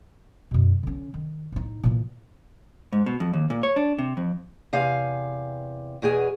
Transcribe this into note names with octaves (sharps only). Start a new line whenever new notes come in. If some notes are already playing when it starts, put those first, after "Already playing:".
F#2 B2
D3 C#4
D#3
A2 D#4
A#2 E3
G#2
B2
F2
D#2
A#2
C#5
D4
C3
F2
E2 C3 F5 G#5
E2 B2 G#4 G#5